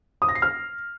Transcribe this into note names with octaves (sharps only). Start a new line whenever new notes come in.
D#6
A#6
C7
F6